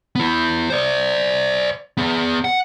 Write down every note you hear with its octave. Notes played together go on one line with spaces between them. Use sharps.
B3 E4
C5 D5
B3 G#4
F#5